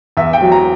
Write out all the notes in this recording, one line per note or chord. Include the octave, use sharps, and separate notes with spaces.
E2 E5
G5
F#3
A#5